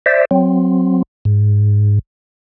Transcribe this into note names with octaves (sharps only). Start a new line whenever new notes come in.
C5 D5 E5
F#3 C4
G#2